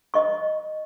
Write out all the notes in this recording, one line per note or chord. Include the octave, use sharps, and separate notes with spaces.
D#5 C#6